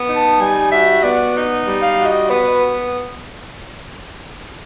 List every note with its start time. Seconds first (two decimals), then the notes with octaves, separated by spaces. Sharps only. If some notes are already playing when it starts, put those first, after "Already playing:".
Already playing: B3
0.09 D#4
0.16 A5
0.40 G3 G#5
0.71 F#4 E5
1.04 B3 D5
1.35 D#4
1.67 G3
1.82 F5
1.99 F#4
2.06 D#5
2.29 B3 B4